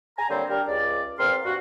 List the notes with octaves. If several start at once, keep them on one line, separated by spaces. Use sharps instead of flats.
G#5 A#5
D3 G3 A#3 C4 C5 C#5
G3 D4 G4 A#4
C#2 D5
E2 C4 A#4 F5 C6 F6
G2 F#4